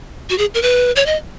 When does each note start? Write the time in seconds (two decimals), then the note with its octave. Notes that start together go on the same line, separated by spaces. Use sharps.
0.30 F#4
0.38 G#4
0.54 A#4
0.62 B4
0.96 C#5
1.06 D#5